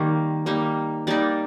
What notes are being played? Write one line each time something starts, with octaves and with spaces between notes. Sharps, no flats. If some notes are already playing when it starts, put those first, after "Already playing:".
Already playing: D#3 G3 A#3
G3 A#3 D#4
G3 A#3 D#4 D5